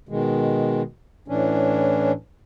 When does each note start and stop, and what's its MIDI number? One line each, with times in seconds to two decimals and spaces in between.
0.09 0.82 47
0.09 0.82 51
0.09 0.82 56
1.28 2.12 45
1.28 2.12 52
1.28 2.12 61
1.28 2.12 62